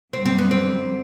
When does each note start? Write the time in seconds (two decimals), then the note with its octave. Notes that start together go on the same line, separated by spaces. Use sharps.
0.13 F#2 D3 G3 C4
0.26 C4
0.38 B3
0.51 C4